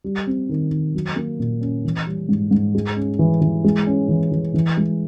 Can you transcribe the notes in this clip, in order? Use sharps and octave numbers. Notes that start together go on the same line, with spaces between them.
G3
C4
D#3
D#3
F#3
A#3
A#2
C#4
E3
G3
G#2
G#2
G#3
C#4
E3
E3
G#3
C#4
E3
E3
E3
G#3